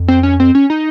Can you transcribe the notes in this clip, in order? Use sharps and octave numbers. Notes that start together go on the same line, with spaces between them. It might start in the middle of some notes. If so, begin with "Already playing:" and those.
Already playing: F2
C4
C#4
C4
C#4
D#4